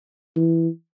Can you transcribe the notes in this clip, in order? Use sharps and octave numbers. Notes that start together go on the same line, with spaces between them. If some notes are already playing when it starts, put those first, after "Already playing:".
E3